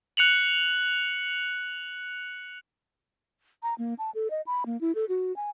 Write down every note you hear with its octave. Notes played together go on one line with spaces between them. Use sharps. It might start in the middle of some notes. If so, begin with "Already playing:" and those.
F#6 C#7 F7 F#7
A#5
A#3
A5
A4
D#5
B5
A#3
E4
A4
F#4
G#5